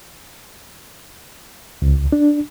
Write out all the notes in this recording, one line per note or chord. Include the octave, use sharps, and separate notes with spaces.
C#2
D4